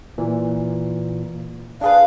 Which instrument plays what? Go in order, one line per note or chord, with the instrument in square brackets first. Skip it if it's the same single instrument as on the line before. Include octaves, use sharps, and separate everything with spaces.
[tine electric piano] A#2 E3
[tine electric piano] D4 G#4 B4 [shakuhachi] F5